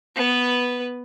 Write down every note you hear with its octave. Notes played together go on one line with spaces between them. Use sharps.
B3 B4